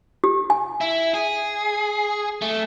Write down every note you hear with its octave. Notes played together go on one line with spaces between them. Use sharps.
G4
G#5
E4
G#4
A3